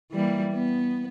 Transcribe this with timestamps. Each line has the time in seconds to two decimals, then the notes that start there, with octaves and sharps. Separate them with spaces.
0.12 E3 G3 A#3
0.53 B3